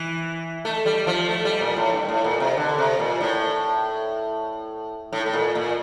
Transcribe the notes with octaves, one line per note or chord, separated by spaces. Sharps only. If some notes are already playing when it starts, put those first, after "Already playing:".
Already playing: E3
A3
G3
F3
A3
G3
A#2
A2
G2
A2
A#2
C3
D3
C3
A#2
A2
A2
A2
A#2
A#2